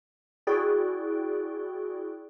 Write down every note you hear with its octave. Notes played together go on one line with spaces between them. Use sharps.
E4 F#4 G#4 D5 G5